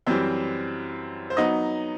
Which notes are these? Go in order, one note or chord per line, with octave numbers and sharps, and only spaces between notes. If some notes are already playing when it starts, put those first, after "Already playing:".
F#2 E3 G3 C4 C5
C5
F#3 B3 D#4 D#5